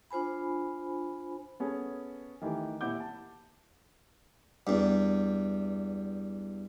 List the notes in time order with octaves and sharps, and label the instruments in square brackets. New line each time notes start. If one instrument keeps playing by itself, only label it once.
[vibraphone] D4 F4 C5 G#5 B5
[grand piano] B3 C#4 G#4 A4
D#3 E3 A3 G4
A#2 E4 G4 F#5 D6 G6
A5
[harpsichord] E2 G2